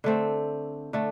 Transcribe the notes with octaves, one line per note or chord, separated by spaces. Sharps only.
D3 A3 C4
D3 A3